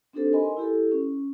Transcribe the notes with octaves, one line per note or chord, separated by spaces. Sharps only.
C4 D4 D#4 G4 A4 C5
A#4 D#5 G#5 B5 C6
E4 G4 A4
C#4